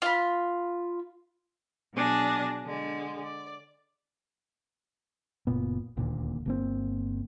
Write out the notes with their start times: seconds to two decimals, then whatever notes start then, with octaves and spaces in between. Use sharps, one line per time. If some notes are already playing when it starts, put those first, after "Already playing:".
0.02 F4 B5
1.94 B2 F#3 D4 G#4 A#6
2.65 D3 G#3
3.22 D5
5.47 F#1 A#2 B3
5.97 D#1 D2 A#2
6.46 G1 A#3 C4